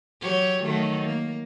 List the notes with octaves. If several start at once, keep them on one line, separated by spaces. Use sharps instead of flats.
F#3 G4 C#5
D#3 F#3 A3
A#3